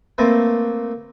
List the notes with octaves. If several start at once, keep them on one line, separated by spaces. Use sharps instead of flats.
A3 A#3 C4 B4